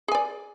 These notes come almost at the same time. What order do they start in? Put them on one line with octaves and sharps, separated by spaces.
G#4 G#5 D5